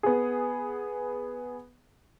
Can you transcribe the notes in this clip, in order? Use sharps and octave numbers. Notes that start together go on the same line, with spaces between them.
B3 G#4